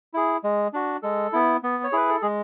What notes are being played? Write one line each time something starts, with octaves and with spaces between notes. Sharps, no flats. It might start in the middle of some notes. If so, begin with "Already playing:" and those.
E4 G#4
G#3
D4 F#4
G#3 A4
B3 E4
B3
C#5
E4 G#4 B4
A4
G#3 G#4